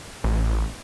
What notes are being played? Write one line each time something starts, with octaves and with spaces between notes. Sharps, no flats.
A1